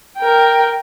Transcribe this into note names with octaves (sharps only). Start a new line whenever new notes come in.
A#4 G5